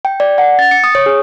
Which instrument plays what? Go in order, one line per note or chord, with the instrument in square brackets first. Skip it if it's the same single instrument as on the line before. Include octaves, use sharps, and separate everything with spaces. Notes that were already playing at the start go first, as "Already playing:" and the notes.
[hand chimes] G5
D5
F#5
A6
C#7
D#6
C#5
G#4